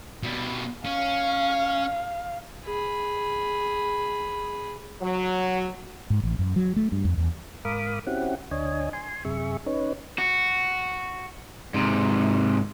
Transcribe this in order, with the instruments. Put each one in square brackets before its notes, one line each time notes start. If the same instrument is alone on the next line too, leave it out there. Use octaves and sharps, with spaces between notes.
[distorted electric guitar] B2 G3
[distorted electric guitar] C#4 [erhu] F5
[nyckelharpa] G#4 B5
[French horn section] F#3
[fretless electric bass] G#2
A1
F#2
F#3
A3
G2
F2
E2
[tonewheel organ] G#2 A#4 F5 B5 D6 D#6
C4 C#4 E4 F#4 G4 F#5
D2 D4 C#5 D#5 G#5
G#5 C6
F#2 C3 G#4 E5 C#6
C#4 D#4 B4 C#5
[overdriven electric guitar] F#4
G#2 C3